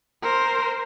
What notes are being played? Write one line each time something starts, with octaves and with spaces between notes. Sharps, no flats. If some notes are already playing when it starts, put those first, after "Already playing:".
A#4 C5